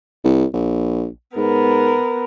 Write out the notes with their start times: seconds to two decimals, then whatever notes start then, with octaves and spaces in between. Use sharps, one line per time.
0.24 C2
0.53 A#1
1.36 G#2 B3 A#4